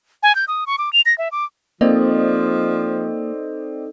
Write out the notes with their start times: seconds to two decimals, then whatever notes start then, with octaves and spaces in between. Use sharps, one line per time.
0.23 G#5
0.35 G6
0.48 D#6
0.67 C#6
0.78 D6
0.93 F7
1.06 A#6
1.18 E5
1.32 D6
1.81 F3 A#3 C4 D#4 A4 D5 D#5